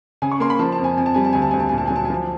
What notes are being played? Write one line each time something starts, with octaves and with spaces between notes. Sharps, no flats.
C#3 G#5
C#6
A#3 C6
B5
F3 A5
A5
F2
G#5
F2 G#5
A5
G3 G#5
A5
D2 G#5
A5
D2 G#5
A5
A#2 G#5
A5
F#3 G#5
A5
G#5
F3 A5